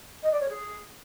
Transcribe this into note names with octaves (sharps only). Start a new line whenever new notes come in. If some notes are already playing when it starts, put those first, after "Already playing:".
D#5
D5
C#5
G#4